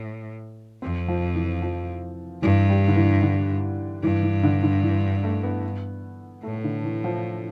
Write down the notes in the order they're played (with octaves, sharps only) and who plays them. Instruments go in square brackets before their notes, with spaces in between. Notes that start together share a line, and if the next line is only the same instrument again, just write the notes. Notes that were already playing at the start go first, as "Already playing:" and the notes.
Already playing: [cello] A2
[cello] F2 [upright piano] C4
[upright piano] F3
E3
F3
[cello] G2 [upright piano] E3
[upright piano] G3
D3
E3
D3
[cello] G2 [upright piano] E3
[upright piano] E3
D3
D3
E3
A3
B3
[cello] A2 [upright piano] A3
[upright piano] D3
E3
F3